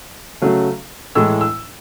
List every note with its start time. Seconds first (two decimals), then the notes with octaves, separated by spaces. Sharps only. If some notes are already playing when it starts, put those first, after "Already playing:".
0.42 C#3 F#3 A3
1.15 A2 E3 G#3 E6
1.41 E6